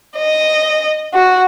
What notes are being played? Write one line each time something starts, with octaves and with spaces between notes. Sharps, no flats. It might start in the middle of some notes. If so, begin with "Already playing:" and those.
D#5
F#4